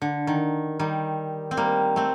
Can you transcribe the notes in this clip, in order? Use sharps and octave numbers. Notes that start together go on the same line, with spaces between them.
D3
D#3
D#3 G3
C4
G3 A#3
A3 C4